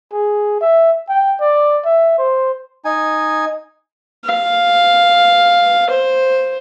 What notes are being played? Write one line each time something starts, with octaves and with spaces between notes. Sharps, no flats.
G#4
E5
G5
D5
E5
C5
D#4 G#5
F5
C5